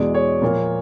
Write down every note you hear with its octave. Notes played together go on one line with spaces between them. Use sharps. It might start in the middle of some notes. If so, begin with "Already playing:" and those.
Already playing: E2 B2 G#3 D5
C#5
A#2 F3 A#3